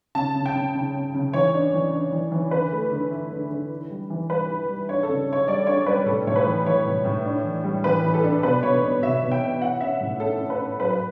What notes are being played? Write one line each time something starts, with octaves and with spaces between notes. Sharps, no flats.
C#3 A5
C#3
G5
C#3
C#3
C#3
C#3
E3 C#5
D4
E3
D4
E3
E3
D3 B4
A3
D3
E4
D3
D3
E4
G3
E3
G3 B4
E4
G3
D4 C#5
A4
C#3
C#3
C#5
G3 D5
D4 C#5
G3 B4
A2 A4
A2 C#5
B4
E3
E3 C#5
A2
A2
D4
E3
G3
E3 B4
E3
A4
D4
B2 B4
B2 C#5
B3
B2 E5
B2
G5
B3
E4 F#5
C#4 E5
A2
C#4 A4
C#4
B4
C#4
F#3 B4
B4